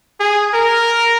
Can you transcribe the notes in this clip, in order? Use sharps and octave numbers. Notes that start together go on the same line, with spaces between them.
G#4
A#4